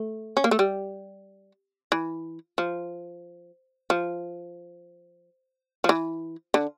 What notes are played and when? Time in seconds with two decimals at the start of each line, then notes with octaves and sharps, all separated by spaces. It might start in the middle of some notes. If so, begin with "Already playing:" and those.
Already playing: A3
0.37 C#4
0.44 A#3
0.51 A3
0.59 G3
1.92 E3
2.58 F3
3.90 F3
5.84 F3
5.89 E3
6.54 D3